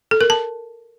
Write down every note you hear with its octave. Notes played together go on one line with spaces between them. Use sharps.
A4
A#4
A5